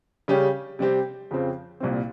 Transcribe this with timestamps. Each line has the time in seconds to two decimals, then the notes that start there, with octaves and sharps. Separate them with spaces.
0.28 C#3 G3 C#4 G4
0.79 C3 G3 C4 G4
1.31 F2 C#3 F3 C4
1.80 C2 A#2 G3 C4